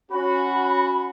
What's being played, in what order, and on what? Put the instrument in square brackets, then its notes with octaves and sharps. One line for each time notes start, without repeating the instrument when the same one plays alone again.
[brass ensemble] C#4 F#4 [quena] B5